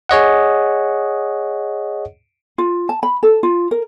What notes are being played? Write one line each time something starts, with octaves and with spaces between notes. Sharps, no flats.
G#4 C#5 D#5 F#5
F4
A5
B5
A4
F4
A#4